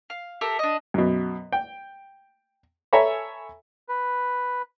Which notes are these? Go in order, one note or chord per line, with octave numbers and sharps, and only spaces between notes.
F5
G4 A4 A#4 E5
D4 D#5
F#2 B2
G5
A4 C#5 E5 G#5 A#5 B5
B4